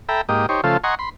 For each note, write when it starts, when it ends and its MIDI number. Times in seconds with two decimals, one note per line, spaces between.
0.09 0.21 69
0.09 0.21 76
0.09 0.21 79
0.09 0.21 82
0.09 0.21 83
0.29 0.46 44
0.29 0.46 58
0.29 0.46 67
0.29 0.46 75
0.49 0.61 63
0.49 0.61 67
0.49 0.61 72
0.49 0.61 73
0.64 0.77 49
0.64 0.77 53
0.64 0.77 57
0.64 0.77 65
0.64 0.77 69
0.64 0.77 72
0.84 0.95 75
0.84 0.95 78
0.84 0.95 80
0.84 0.95 82
0.84 0.95 84
0.84 0.95 85
0.99 1.10 83
0.99 1.10 84